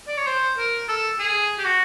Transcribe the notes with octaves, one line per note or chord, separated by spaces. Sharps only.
D5
C#5
C5
A#4
A4
G#4
G4
F#4